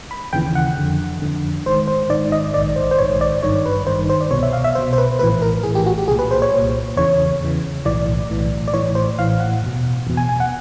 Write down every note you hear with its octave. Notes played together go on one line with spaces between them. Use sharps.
B5
D#2 C#3 E3 G5
F#5
F2 D3
F2 D3
G#1 G#2 D#3 C5
C5
G#1 G#2 D#3 D5
D#5
A#1 G#2 D#3 D5
C5
C5
A#1 G#2 D#3 C#5
D5
G#1 G2 D#3 C#5
B4
G#1 G2 D#3 C5
C5
D5
C2 B2 C#5
E5
F5
E5
C2 B2 C5
C5
B4
A#1 A2 E3 B4
A#4
A#1 A2 E3 G#4
G4
F#4
G4
C2 A#2 G#4
B4
C5
C#5
C2 A#2
E2 C#3 E3 C#5
E2 C#3 E3
B1 A2 E3 D5
B1 A2 E3
D5
A1 A2 E3 C#5
C5
A1 A2 E3 F5
F#5
E2 B2
E2 B2
G#5
G#5
F#5